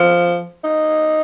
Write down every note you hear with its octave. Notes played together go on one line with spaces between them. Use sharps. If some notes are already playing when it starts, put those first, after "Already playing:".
Already playing: F3
D#4